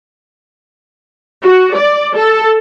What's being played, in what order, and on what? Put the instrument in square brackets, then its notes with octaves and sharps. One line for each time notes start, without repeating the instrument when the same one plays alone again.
[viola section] F#4
D5
A4